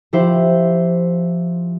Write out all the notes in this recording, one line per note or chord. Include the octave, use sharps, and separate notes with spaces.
F3 E4 G4 C5